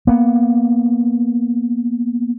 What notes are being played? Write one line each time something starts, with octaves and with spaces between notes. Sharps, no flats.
A#3 B3